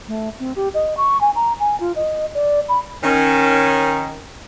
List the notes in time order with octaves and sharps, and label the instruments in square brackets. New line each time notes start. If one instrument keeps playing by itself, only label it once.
[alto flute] A3
C4
G4
D#5
C#6
G#5
A#5
G#5
F4
D#5
D5
B5
[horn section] D#3 C#4